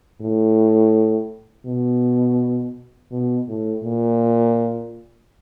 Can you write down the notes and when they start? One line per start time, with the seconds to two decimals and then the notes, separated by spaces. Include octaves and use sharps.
0.21 A2
1.66 B2
3.11 B2
3.48 A2
3.84 A#2